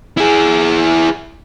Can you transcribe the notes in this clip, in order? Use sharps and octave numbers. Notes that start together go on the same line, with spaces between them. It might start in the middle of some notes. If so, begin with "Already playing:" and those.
E4 G#4